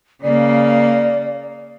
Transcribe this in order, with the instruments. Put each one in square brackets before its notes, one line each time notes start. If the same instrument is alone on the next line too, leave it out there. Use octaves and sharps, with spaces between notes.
[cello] C#3 A#3 [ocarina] D5